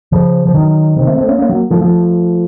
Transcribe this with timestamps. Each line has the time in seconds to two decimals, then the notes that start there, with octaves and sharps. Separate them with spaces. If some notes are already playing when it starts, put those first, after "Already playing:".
0.12 C#3 F3
0.46 F3
0.54 D#3 F#3
0.96 C3 D#3
1.07 A3 C4
1.18 A3 C4
1.28 A#3 C#4
1.39 A#3 C#4
1.49 F#3 A#3
1.70 F3 A3
1.81 F3 A3